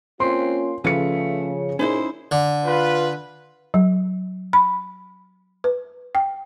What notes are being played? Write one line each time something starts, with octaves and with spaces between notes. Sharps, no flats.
A#3 C4 C#4 F4 C6
C#3 F3 A3 C#4 B4 F5 C#7
A#2 C#4 D#4 E4 G#4 C5
D3
F4 B4
F#3
B5
B4
G5